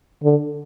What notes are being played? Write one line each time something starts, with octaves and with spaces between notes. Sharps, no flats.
D3